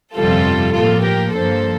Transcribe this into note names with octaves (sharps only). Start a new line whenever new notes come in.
G1 F2 C3 G3 F4 A4
A2 F3 A#3 F4 A4
G4 A#4
G2 D3 F3 A#3 A4 C5